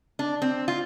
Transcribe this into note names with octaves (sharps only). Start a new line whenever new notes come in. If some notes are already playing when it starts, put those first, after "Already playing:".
D4
C4
F4